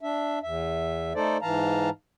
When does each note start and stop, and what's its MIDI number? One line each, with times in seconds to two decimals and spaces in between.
0.01 0.39 62
0.01 0.39 76
0.43 1.13 40
0.43 1.13 76
1.15 1.37 57
1.15 1.37 63
1.15 1.37 69
1.15 1.37 72
1.15 1.37 74
1.42 1.90 44
1.42 1.90 52
1.42 1.90 77
1.42 1.90 81
1.42 1.90 82